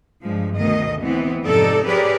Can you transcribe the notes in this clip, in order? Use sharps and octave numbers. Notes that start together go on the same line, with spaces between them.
G2 F3 G#3
D2 B2 D#3 D#5
E3 B3 C4
F2 G#2 C3 D#4 A4 D5
G4 G#4 A#4 B4 C#5 D5